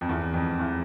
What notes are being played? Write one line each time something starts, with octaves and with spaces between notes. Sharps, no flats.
F2
E2
F2
E2